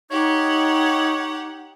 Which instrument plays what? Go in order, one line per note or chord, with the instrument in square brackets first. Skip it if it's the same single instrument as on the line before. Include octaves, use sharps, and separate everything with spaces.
[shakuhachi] D#4 [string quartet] G4 F#5 [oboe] C#5